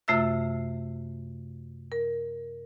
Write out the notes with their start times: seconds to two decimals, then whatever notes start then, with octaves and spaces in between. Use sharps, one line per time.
0.08 F#2 C3 A3 F4 E5 E6
1.92 A#4